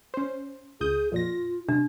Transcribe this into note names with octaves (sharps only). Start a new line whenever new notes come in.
C#4 C5
C#2 G#4 D#6 G6
F2 A#2 F4 A#6
C3 D4